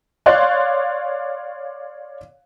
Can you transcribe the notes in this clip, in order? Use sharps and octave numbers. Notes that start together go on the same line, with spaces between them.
C#5 D5 F5 C6 F#6